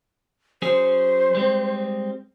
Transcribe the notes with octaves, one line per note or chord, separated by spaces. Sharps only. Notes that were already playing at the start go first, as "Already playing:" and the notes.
F#3 C#4 G#4 C5
G3 G#3 C4